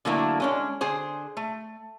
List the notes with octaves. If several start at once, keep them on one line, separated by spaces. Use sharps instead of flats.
D3 F#3 A3 A#3 D4 E4
G#3 C#4 D4
D3 G#4 C5
A3